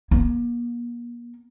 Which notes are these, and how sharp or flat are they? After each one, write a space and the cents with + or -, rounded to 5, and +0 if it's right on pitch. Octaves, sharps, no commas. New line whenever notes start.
A#3 +40